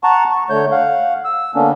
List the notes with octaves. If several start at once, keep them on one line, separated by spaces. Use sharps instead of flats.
F#5 A5 A#5 C#6
C#6
D3 A3 C#5 G6
F5 F#5
E6
D3 A#3 B3 C#4 D4